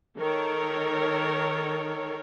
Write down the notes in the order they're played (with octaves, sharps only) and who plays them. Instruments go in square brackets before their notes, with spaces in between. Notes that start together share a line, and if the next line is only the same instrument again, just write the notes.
[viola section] D#3 A4 A#4 C#5